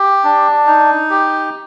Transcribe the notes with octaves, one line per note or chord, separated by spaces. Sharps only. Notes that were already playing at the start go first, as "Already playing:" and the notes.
Already playing: G4
D4
D#4
G4